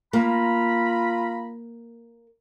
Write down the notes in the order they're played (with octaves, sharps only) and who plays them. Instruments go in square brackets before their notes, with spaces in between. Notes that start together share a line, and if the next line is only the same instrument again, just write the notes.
[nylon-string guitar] A#3 [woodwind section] F4 A#5 B5